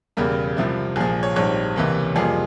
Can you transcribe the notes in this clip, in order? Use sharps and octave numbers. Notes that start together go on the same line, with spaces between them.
E1 E2 C#3 G3 A#4
C2 C3 F3 C4 E4
A#1 A#2 F3 G#4
C#5
A#1 G#2 G3 C4 C#5
C#2 C3 E3 A#3
F2 C3 G3 A#3 F4 G#4